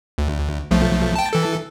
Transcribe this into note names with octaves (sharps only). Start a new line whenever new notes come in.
D2
B1 F3 A3
G5 A5
E3 A4